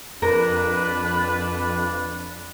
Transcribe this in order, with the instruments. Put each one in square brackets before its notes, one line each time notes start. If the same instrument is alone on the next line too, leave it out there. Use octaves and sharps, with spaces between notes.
[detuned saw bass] F2 [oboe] D4 [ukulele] A#4 [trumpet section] B4